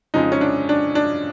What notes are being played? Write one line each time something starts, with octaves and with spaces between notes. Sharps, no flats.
F2 C#3 F3 G#3 D#4
C#4
D4
D4
D4